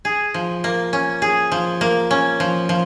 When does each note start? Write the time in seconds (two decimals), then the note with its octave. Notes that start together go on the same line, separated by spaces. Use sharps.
0.05 G#4
0.34 F3
0.64 A#3
0.93 C#4
1.22 G#4
1.52 F3
1.81 A#3
2.11 C#4
2.40 F3
2.69 F3